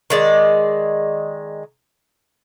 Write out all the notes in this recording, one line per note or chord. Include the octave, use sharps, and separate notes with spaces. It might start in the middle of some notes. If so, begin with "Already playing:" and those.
D#3 G#3 D5